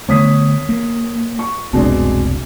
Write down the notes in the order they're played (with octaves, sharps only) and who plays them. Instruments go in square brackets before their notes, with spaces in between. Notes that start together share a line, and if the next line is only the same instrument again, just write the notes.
[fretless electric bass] D3 A3 B3 [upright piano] C#5 D#6 B6
[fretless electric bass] A#3
[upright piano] C#6
[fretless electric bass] F1 C2 C4 [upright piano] B2 G#3 D4